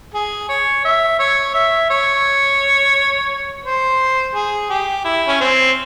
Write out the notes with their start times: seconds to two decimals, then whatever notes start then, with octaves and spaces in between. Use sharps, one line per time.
0.14 G#4
0.49 C#5
0.85 E5
1.19 C#5
1.54 E5
1.90 C#5
3.65 C5
4.35 G#4
4.70 G4
5.04 E4
5.28 C#4
5.41 C4